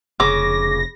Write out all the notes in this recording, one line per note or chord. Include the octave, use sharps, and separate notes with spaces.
F1 C#3 D6 A#6